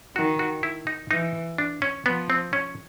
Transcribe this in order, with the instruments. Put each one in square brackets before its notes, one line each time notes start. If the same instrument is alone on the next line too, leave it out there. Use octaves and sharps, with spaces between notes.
[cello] D#3 [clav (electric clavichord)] F#4
[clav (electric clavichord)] F#4
E4
D#4
[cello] E3 [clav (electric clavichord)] D#4
[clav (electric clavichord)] D4
C#4
[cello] F3 [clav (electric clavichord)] B3
[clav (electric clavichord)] C4
C#4